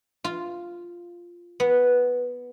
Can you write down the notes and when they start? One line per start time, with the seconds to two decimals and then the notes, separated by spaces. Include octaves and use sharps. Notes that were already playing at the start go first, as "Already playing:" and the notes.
0.24 F4
1.60 B3